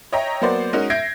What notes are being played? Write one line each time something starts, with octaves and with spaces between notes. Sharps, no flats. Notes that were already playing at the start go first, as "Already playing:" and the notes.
C#5 D#5 E5 G5 A#5
F#3 A#3 B3 C5 D5
G#3 C#4 D#4 F#4 A#4
E5 G6 G#6 A#6 C7 D7